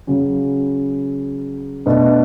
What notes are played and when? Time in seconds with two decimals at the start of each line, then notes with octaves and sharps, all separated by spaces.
0.07 C#3 F#3 C#4
1.86 B2 A3 D4